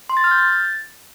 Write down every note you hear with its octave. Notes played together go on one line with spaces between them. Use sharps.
C6
A6
F6
G6
A6